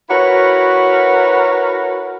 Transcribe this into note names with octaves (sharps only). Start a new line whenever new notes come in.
E4 F#4 A#4 B4 C#5